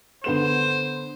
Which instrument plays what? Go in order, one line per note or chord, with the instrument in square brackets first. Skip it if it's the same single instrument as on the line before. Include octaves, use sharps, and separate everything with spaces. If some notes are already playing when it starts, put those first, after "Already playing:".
[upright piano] D3 B3 E7 [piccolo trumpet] C5